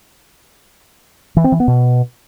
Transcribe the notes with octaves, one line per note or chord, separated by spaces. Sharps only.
E3
C4
E3
B3
B2